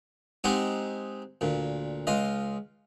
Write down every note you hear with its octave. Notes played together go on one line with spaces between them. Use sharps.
G#3 C4 D#4 G4 C5 F#5
D2 A#2
C#2 F4 D#5